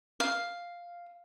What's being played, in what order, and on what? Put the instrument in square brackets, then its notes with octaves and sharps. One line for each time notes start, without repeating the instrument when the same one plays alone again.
[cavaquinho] F5